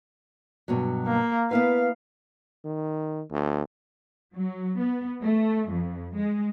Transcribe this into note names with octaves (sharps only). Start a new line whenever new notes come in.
G2 B2 F#3
A#3
B3 E4 B4 F5
D#3
D2
F#3
B3
A3
F2
G#3